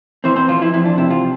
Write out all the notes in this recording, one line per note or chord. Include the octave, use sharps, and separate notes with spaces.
E3 C4 C5
C4 C5
F2 F3 F4
E4
F2 E4
D4
C3 E4
F3 F4